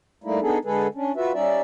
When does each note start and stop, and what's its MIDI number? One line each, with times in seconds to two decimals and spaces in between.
0.24 0.40 55
0.24 0.40 57
0.24 0.40 58
0.24 0.40 63
0.24 0.40 64
0.41 0.58 59
0.41 0.58 62
0.41 0.58 63
0.41 0.58 68
0.41 0.58 69
0.65 0.87 50
0.65 0.87 56
0.65 0.87 68
0.65 0.87 69
0.65 0.87 71
0.95 1.12 61
0.95 1.12 62
1.16 1.32 65
1.16 1.32 66
1.16 1.32 71
1.16 1.32 76
1.34 1.62 55
1.34 1.62 61
1.34 1.62 63
1.34 1.62 74
1.34 1.62 76